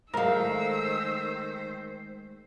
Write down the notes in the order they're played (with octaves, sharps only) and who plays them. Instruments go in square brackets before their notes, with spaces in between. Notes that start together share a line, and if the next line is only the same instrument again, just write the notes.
[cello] D#3 C5 [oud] G#3 A3 [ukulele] A#4 F5 [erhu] E6